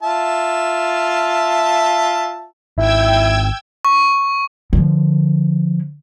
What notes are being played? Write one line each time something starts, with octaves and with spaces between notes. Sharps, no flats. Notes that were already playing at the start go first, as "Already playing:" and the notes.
F4 E5 A5
G#1 E4 G5 E6 G#6
C#6
D3 F3